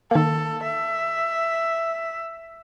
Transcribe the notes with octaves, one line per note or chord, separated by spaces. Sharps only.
D#3 A#3 A4
E5